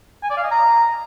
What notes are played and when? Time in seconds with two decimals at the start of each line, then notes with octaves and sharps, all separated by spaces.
0.23 G#5
0.30 D5
0.37 F5
0.44 D#5
0.51 A#5